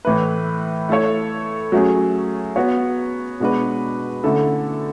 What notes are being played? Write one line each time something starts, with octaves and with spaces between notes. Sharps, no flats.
A2 E3 A3 E4 B4
A3 E4 A4 C#5
F#3 A3 C#4 G#4
B3 F#4 C#5
B2 G#3 D4 F#4 B4
D3 A3 C#4 E4 A4